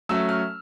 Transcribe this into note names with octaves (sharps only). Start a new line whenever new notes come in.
F#3 A3 C#4 E6
F6